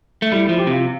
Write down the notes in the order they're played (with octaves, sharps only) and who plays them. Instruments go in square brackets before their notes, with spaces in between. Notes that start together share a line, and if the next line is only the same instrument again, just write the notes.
[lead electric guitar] A3
[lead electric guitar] G3 [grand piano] E4
[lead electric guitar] F3 [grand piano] E4
[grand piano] G4
[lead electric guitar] C3 [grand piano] F4